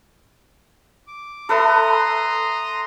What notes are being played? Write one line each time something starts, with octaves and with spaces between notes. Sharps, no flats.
D6
A4 B4 E5 A#5 C6 D#6